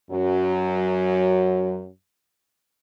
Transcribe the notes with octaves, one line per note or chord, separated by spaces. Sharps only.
F#2 F#3